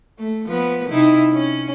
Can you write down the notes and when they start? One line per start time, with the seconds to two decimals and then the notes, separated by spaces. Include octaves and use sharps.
0.18 A3
0.47 F3 B3 B4
0.89 C3 D#4 E4
1.32 C#4